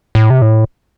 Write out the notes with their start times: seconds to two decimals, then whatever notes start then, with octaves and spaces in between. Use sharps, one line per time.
0.15 A2
0.30 C3
0.42 A2